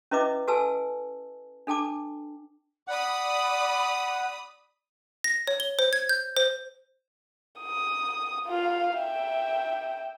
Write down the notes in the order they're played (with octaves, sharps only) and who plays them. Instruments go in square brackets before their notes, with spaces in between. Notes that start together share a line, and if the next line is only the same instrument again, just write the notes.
[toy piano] C#4 E4 B4 D#5 E5 D6
F#4 A4 B4 G#5 A5 E6
D4 A4 G5 A5 D6
[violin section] D5 B5 D#6 [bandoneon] F#5
[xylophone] A#6
C#5
G7
C5
G#6
G6
C5
[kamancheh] D#6
F4 F5
E5 G5